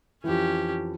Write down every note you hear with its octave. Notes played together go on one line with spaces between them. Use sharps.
F2 E3 C#4 G4